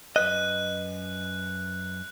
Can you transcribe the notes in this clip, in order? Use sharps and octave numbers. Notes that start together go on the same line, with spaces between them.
F#2 B4 D#5 F#6